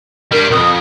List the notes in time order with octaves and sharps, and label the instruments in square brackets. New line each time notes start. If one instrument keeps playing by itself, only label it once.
[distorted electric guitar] G3 D4 [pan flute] A#4
[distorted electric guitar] B1 F2 [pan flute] D#6